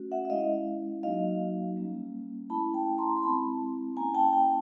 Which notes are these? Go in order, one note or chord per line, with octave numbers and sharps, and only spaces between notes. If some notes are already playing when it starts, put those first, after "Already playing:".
Already playing: A3 C#4 F#4
E5 F#5
E5
G#3 C#4 E4 D#5 F5
F#3 A#3 D#4 F#4 D#5 F5
G3 A#3 C#4
A3 C#4 E4 A5 B5
G5 A5
A#5 C6
C6
G#3 C4 E4 A5 B5
A#3 C#4 E4 G#5 A#5
G5 A5
G5 A5